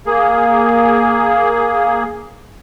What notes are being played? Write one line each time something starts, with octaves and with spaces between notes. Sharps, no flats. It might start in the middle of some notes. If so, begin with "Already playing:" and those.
A#3 G#4